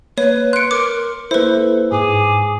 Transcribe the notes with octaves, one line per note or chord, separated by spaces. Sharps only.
A#3 B4 C#5
C6 F#6 C#7 D7
A#4 D6
A#3 E4 A4 B4 C5
G#2 G#4 D6